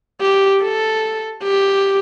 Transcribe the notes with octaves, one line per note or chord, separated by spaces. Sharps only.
G4
A4
G4